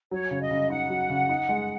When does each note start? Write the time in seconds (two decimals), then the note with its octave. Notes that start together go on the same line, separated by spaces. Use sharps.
0.11 F#3 C#5
0.31 C#3
0.41 D#5
0.51 C#3
0.70 D#4 F#5
0.90 F#3
1.10 C#3
1.29 D#4
1.49 G#3